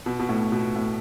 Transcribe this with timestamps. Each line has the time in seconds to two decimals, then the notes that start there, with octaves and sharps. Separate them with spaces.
0.06 B2
0.19 B2
0.29 A2
0.52 B2
0.76 A2